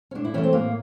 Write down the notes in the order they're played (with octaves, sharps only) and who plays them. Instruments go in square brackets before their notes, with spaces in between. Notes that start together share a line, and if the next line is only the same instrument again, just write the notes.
[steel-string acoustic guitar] C#4
A2 D4
E4
E3 A3 C#4
C4
A2 A#3